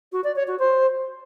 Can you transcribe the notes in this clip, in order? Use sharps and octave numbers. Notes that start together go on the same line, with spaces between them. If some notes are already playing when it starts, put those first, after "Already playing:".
F#4
D5
C#5
F#4
C5